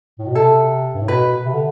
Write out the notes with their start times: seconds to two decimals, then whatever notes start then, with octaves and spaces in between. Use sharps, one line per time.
0.19 A2
0.26 B2
0.35 C3 A4
0.94 G2
1.01 A2
1.08 B2 B4
1.45 C3
1.54 D3